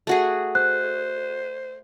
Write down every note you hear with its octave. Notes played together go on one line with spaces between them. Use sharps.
A3 F#4 G#4
C5 F#6